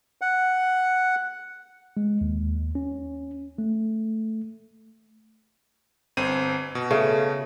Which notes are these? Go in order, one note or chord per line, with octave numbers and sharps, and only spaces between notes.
F#5
G#3
D#2
C#4
A3
G1 C4 D#7
B2
C#3 A3